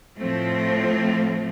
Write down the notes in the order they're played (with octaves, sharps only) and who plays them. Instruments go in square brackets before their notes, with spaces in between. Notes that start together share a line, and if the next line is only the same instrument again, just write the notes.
[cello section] A2 F3 A3 C4